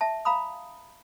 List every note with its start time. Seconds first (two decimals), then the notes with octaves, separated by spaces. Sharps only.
0.01 E5 A5
0.25 F5 A#5 B5 D#6